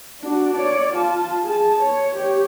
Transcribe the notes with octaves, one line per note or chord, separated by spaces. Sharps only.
D4 F#4
C#5 D5
F4 A5
G#4 A5
C#5
G4 C#5